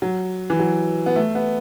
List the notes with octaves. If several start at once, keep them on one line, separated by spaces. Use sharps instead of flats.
F#3
E3
F#3
B3
A3
B3